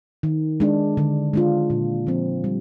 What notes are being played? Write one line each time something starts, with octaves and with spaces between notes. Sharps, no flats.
D#3
G#3 D4
D3
G#3 D4 F4
A#2
F3 C4
G3